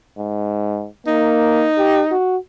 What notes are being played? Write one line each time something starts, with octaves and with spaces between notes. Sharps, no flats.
G#2
A#3 D#4
G4
F#4